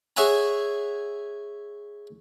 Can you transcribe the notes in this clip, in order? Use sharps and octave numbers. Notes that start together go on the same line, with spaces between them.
G#4 C#5 E5 F#5 G#5 A#5